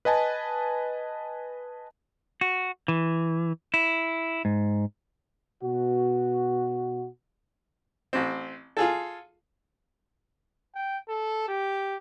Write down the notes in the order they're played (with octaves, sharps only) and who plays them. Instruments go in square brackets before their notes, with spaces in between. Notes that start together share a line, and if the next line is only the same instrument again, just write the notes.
[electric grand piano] B4 D#5 G#5 A5
[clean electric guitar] F#4
E3
E4
G#2
[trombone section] B2 F#4
[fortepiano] A1 C4
F4 G#4 A4
[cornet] G5
A4
G4